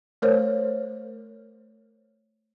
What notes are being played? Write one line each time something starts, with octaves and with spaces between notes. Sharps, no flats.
A3 A#4 C5 C#5